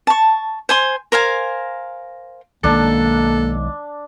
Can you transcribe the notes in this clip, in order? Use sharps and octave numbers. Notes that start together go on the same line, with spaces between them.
A5 C#6
C5 G#5 C6
A#4 C5 F5 G#5
B1 D#3 G#3 A#3 D4 A4